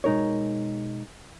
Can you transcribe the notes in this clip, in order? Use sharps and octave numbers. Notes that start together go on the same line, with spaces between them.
B2 G#3 D#4 A#4 C#5